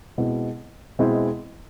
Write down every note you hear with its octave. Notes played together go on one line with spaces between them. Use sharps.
B2 G#3 C4 E4
B2 G#3 C4 E4